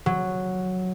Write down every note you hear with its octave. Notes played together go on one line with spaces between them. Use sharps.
F#3